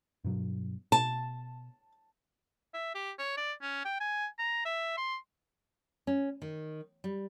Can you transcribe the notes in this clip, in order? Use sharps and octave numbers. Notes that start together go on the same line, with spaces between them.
G2 B2 F#3
B2 A5
E5
G4
C#5
D5
C#4
G5
G#5
A#5
E5
C6
C#4
D#3
G3